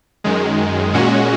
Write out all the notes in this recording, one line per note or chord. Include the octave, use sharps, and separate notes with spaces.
F#2 D#3 G#3
A#2 G#3 C#4 F#4